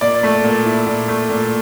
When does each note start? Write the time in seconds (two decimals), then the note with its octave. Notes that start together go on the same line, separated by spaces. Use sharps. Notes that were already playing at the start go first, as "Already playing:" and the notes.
0.01 A#2 D5
0.23 A3
0.44 A#2
0.65 E4
0.86 A#2
1.08 A3
1.30 A#2